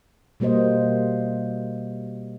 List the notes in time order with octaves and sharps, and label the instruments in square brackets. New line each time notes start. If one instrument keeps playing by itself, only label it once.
[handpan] B2 G3 A#3 C5 D#5